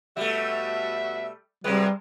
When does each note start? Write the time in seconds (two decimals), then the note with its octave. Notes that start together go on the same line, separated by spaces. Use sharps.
0.17 B2 G3 A3 F#4 E5
1.64 C3 G3 G#3 F#4 G4 B4